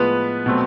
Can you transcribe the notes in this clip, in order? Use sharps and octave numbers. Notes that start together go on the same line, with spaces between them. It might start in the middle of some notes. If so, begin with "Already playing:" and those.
Already playing: A2 F3 G#3 B3 B4
B2 F#3 A3 C4